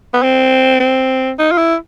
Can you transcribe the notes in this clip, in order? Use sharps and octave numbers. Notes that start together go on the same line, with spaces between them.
B3
C4
C4
D#4
F4
E4